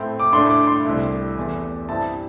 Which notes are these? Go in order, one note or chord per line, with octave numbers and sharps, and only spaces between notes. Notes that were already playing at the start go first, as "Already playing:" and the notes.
Already playing: A2 A3 C4 G5
D6
A2 A3 D4 C6
D6
C6
C2 C3 A3 E4
E2 E3 A3
G2 G3 C4 E4 A5